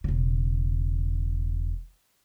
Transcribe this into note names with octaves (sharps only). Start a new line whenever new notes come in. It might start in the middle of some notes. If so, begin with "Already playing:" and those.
E1 C#3